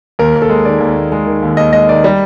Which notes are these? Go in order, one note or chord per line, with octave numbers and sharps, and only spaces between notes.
D#2 A#4
D#2
A4
G#3
D#3 D5
D#2
D#2
G#3
D#3
D#2
D#2 D#5
G#3 D#5
D#3 D5
G3